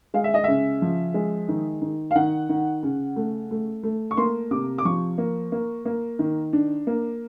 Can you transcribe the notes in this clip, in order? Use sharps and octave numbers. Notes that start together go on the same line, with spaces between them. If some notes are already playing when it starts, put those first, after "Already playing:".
G#3 F5
E5
D#5
C#3 E5
F3
G#3
D#3
D#3
F5
D#3 F#5
D#3
C#3
A3
A3
A3
C#6
A#3 C6
C3 D6
D6
F3 C#6
A#3
A#3
A#3
D#3
D4
A#3